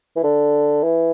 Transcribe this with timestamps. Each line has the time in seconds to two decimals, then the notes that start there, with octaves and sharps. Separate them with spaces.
0.16 E3
0.23 D3
0.83 E3